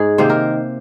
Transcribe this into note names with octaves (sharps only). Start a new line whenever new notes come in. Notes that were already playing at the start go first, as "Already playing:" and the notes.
Already playing: G#2 G#3 G#4
C3 D#3 A#3 C5
A#4